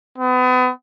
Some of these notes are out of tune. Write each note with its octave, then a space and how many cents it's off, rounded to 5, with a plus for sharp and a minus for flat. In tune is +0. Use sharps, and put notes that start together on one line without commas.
B3 +35